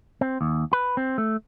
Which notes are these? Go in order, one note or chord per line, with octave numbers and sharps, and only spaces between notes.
C4
D#2
B4
C4
A3